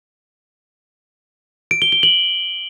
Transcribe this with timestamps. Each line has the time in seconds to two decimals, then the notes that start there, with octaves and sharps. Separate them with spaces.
1.71 D7
1.82 G7
1.92 G7
2.03 F#7